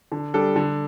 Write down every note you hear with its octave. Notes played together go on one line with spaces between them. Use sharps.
D3
G3 D4 A4
D3